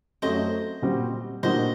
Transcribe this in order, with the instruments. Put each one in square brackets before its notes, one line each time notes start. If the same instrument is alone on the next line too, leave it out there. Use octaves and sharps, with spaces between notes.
[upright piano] F#2 F#3 A3 C4 [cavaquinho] C5 D#5
[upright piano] A#2 G3 C4 F#4
[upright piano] A#2 G3 A#3 D4 F#4 [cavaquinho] C5 D#5